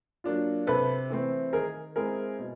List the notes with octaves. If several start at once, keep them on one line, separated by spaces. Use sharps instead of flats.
F#3 A#3 D4 F4
C3 A4 B4
E3 A3 C4
D#3 G#4 A#4
G#3 C4 E4 G#4 A#4
B2